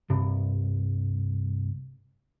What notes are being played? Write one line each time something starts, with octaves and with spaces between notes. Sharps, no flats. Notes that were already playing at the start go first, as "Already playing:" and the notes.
C2 G2